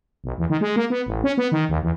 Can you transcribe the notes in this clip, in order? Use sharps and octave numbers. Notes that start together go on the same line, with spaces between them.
B1
E2
D#3
G#3
A#3
B3
A1
C#4
B3
D#3
D#2
E2